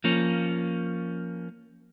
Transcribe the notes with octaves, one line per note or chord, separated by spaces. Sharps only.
F3 A#3 C#4